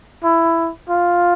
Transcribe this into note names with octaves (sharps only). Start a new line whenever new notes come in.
E4
F4